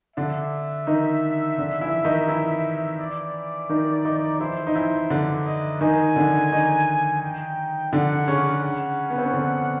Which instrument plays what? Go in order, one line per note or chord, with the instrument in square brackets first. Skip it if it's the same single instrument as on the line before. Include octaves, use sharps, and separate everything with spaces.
[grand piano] D3 D4 [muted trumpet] E5
[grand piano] D#3 D#4
D3 D4
E3 E4
D#3 D#4
E3 E4
[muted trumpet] D5
[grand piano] D#3 D#4
D#3 D#4
[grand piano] E3 E4 [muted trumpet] C5
[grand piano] D#4
E3 E4
D3 D4
[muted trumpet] D#5
[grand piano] D#3 D#4 [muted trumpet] G#5
[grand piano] D3 D4
D#3 D#4
[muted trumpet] G5
[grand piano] D3 D4 [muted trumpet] F#5
[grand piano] C#3 C#4
[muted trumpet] F#5
[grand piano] B3
C4
C#4
D3 D4